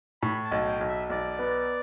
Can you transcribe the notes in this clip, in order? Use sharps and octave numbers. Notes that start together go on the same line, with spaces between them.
A2 B5
A5
B1
G5
B1
E5
B1 D5
B3